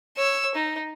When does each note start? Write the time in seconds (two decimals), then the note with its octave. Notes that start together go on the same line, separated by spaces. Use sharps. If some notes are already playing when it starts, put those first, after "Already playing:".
0.17 C#5 E6
0.55 D#4